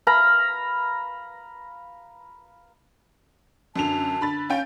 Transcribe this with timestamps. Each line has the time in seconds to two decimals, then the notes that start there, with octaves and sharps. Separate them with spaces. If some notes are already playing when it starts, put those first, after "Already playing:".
0.07 F5 A#5 B5
3.76 F#2 D3 A5 F7
4.21 D3 B5 A6
4.50 C#4 F5 G5